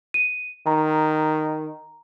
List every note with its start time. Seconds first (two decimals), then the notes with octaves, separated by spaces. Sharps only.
0.14 D#7
0.67 D#3 A#5